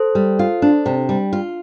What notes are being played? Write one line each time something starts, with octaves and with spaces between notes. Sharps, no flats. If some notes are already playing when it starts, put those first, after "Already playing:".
Already playing: A4 C5
G3
F4
D4
C3
G3
F4